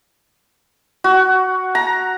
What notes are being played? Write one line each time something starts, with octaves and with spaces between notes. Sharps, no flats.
F#4
A#5